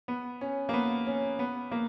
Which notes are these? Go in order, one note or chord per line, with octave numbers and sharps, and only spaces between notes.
B3
C#4
A#3
B3
C#4
B3
A#3